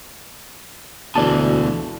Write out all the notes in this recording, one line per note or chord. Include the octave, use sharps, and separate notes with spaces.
D2 B2 E3 D5 A5